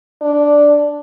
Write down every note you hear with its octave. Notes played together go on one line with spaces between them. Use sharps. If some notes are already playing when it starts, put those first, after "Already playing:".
D4